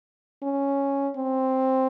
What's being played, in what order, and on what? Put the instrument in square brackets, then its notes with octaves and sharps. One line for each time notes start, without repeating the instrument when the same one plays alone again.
[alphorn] C#4
C4